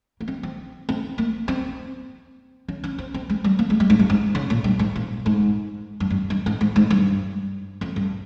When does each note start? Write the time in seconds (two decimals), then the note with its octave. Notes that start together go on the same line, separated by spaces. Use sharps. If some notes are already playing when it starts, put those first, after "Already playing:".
0.21 A#3
0.28 C4
0.43 C4
0.89 C4
1.18 A#3
1.48 C4
2.68 C#4
2.84 C#4
2.98 C4
3.14 C4
3.30 G#3
3.44 G3
3.59 A#3
3.70 G#3
3.80 G3
3.90 G#2
3.99 G2
4.10 G#2
4.35 C#3
4.50 A#2
4.64 G2
4.79 G#2
4.96 A#2
5.26 G#2
6.00 G2
6.10 G2
6.30 G2
6.46 G#2
6.61 G#2
6.76 G#2
6.90 G2
7.81 F2
7.96 G2